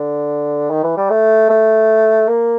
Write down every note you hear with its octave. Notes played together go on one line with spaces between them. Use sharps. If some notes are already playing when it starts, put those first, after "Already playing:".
Already playing: D3
D#3
E3
G3
A3
A3
A#3